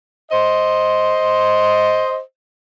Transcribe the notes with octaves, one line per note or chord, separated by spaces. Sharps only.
C5 D#5